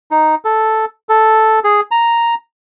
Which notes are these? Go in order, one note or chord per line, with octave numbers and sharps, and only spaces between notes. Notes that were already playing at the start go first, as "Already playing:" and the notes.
D#4
A4
A4
G#4
A#5